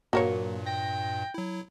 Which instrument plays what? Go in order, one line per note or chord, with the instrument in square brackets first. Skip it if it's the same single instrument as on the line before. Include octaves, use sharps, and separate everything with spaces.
[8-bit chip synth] G2 A#2 [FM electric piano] F#3 A#3 [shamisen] F#4 A#4 C#5
[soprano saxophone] G5 [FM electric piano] A#6
[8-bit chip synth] F#3 E4